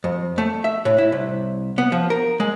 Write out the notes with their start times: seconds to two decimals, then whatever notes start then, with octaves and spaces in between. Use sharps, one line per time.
0.04 F2
0.38 A3
0.64 E5
0.85 A2
0.98 E4
1.12 C2
1.78 B3
1.92 F3
2.10 A#4
2.40 G#3